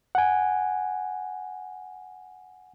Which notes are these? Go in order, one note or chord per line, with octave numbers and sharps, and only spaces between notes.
F#5 G#5